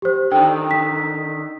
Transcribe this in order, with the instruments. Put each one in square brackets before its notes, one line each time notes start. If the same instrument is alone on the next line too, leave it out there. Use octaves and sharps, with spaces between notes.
[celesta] G4 C5
[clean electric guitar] D3 D#3 [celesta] G5
[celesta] B6